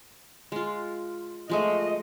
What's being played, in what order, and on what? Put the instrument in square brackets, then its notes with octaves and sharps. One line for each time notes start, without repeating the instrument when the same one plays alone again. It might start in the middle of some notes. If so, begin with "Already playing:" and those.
[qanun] G#3 F4
[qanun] F3 G#3 A3 [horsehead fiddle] D#5